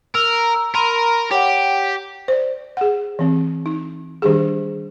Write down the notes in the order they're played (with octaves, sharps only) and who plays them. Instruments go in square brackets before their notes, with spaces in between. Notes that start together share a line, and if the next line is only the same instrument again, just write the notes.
[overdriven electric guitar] A#4 [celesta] E6
[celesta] A#5 E6
[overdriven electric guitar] A#4 [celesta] B5 C6 D#7
[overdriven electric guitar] G4 [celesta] C#5 F#5
[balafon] C5 D5
G#4 F#5
E3 C4
D#4
D#3 G3 D4 G4 G#4